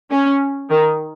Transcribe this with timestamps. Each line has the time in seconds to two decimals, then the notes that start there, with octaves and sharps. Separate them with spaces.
0.11 C#4
0.70 D#3